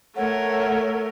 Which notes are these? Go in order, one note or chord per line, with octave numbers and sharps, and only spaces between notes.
A3 A#4 C#5 F#5